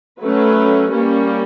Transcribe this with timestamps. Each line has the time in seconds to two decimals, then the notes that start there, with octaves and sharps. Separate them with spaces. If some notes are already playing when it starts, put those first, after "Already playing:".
0.20 F#3 A3 C#4 B4
0.92 G3 A#3 C#4